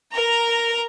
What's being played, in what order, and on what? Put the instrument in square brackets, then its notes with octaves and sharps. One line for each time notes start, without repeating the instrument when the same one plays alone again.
[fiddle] A#4 A#5